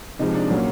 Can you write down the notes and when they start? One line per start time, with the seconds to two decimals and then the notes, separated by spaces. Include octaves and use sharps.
0.19 C3 F3 G#3 D#4
0.35 D4
0.50 A#2 F#3 A#3 C#4